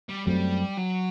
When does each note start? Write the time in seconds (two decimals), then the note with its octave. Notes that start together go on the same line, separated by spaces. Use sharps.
0.09 G3
0.27 F#2 F#3 G3 A3 C4
0.78 F#3